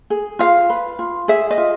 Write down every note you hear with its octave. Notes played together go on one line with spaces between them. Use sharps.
G#4
F4 F5
B4
F4
G#4 E5
D#5
F4